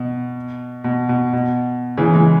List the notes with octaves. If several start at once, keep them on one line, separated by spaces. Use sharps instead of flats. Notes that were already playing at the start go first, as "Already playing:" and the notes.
Already playing: B2
B2
B2
B2
C#3 E3
E3 G#3